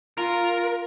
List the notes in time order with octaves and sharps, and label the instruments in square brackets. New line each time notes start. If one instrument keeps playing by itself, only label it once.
[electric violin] F4 [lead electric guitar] A#4